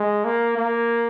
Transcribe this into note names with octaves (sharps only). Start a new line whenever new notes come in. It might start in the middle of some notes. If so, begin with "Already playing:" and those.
Already playing: G#3
A#3
A#3